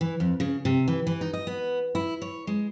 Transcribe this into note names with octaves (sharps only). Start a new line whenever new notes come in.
E3
F2
C#3
C3
E3
E3
D#4
D#5
B3
E4
C#5
G#3